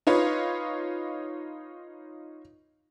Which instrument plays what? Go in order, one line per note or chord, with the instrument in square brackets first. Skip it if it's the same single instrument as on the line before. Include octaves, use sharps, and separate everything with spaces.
[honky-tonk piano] D#4 F4 B4 C#5